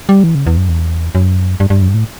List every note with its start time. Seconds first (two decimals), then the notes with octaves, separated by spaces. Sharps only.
0.09 G3
0.24 E3
0.35 C#3
0.47 E2
0.57 F#2
0.69 E2
1.15 F#2
1.60 G2
1.70 G2
1.82 F#2
1.89 G2
1.94 A2